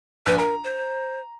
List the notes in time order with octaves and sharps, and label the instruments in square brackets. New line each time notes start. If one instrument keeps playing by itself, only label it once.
[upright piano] A#1 [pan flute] B4
[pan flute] A#4 [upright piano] A#5
[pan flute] C5